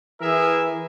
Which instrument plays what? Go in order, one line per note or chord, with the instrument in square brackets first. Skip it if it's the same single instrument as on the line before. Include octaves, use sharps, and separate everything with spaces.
[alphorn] E3 [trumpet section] G#4 A#4 E5